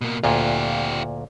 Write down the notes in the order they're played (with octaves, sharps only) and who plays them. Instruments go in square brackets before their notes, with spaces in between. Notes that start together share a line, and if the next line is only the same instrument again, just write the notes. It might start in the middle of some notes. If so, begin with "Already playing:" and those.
[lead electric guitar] B2 A#3
[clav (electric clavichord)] D2 A#2 [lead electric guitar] F4 G4